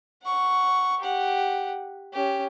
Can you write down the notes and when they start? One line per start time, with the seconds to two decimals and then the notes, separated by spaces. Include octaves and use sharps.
0.23 F#5 C#6
1.00 G4 F#5
2.13 C#4 G4